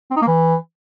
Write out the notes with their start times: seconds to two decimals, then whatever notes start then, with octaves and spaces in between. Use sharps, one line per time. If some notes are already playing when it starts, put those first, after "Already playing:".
0.11 C4
0.16 D#4
0.22 A#3
0.28 E3